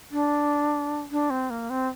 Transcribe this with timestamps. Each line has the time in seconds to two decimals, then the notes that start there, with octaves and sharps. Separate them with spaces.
0.11 D4
1.11 D4
1.30 C4
1.50 A#3
1.70 C4